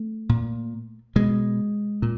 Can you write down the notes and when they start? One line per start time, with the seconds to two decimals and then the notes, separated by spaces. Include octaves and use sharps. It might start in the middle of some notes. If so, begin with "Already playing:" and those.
Already playing: A3
0.29 A#2
1.16 B2 G#3
2.02 A#2